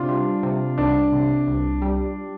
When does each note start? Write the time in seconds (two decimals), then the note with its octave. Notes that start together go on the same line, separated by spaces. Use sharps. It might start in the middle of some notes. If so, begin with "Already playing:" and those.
Already playing: C3 D4 F4
0.08 G3
0.43 C3
0.78 C2 D4
1.12 C3
1.47 C2
1.82 G3